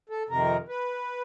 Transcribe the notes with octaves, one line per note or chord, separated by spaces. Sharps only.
A4
F2 C3 D#3 A#4
B4